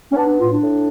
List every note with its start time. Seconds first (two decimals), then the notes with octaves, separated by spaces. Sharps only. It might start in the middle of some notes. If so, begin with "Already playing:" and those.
0.11 C#4
0.16 B3 D4
0.27 D4
0.39 A2 F4
0.50 D4
0.61 A2